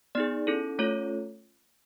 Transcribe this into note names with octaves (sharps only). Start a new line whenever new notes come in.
B3 D#4 G#4 D5
C#4 E4 A4
A3 C#4 F4 A4 C#5